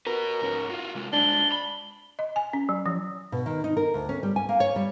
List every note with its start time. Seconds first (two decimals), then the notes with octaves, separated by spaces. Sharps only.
0.07 F#4 A#4 B4
0.41 G#2 C#4
0.70 F4 F#4
0.95 C3 G#3
1.13 C2 G#3 D4 G7
1.52 B5
2.19 D#5
2.36 G#5
2.53 C#4
2.69 F#3
2.86 F3
3.32 B2
3.46 D#3
3.64 D#4
3.77 A#4
3.94 D2
4.09 C#4
4.23 G3
4.36 G#5
4.49 A#3
4.60 C#5
4.76 G3